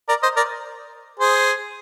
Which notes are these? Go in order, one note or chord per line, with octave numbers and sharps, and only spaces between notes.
A#4 D5
C5 D#5
A#4 D5
G#4 C5